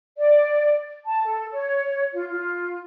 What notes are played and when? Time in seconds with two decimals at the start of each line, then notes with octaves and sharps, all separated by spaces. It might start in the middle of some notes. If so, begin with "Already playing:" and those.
0.18 D5
1.05 A5
1.26 A4
1.52 C#5
2.13 F4
2.30 F4